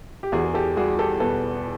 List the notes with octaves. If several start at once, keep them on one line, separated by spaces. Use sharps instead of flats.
G4
E2 F#4 G#4
G#4
G4 A4
G3 F#4 G#4
G4 A4
B2 A4 B4